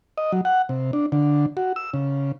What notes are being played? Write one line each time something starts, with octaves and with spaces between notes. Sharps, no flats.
D#5
F#3
F#5
C3
D4
D3
F#4
E6
C#3